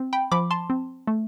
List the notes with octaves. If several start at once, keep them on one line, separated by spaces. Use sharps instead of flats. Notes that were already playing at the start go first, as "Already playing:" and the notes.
Already playing: C4
G5 B5
F3 B5 D6
A5 C6
C4
A3